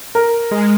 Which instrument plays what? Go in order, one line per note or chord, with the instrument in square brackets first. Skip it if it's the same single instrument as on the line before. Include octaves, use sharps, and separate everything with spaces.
[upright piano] A#4
[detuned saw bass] G#3